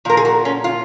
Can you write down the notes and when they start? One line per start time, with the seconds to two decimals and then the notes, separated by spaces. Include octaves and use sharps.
0.05 A#2 F3 A#4
0.17 G#4
0.25 F#4
0.45 C#4
0.64 F4